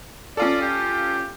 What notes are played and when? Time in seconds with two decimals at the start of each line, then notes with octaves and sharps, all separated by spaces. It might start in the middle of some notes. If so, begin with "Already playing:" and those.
0.37 C#4 F4 A4 D5
0.62 G4